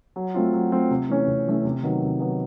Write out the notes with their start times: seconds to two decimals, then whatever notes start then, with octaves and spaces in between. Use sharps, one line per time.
0.16 F#3
0.34 A3 C4 F4
0.54 F#3
0.72 A3 C4 F4
0.91 C3
1.09 E3 A3 C#4
1.27 C3
1.46 E3 A3 C#4
1.65 C3
1.83 D#3 F#3 B3
2.02 C3
2.20 D#3 F#3 B3